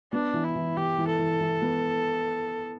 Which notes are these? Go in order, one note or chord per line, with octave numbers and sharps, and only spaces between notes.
B3 D4
E3
E4
E3
E3 G4
E3
A4
E3
E3
B3